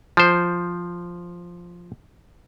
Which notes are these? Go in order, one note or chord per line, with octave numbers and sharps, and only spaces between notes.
F3 C5